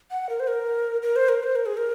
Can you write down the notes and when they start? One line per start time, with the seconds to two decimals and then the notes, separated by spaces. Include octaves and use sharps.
0.11 F#5
0.29 A#4
0.40 C5
0.48 A#4
1.02 A#4
1.16 C5
1.29 A#4
1.43 C5
1.56 A#4
1.66 G#4
1.77 A#4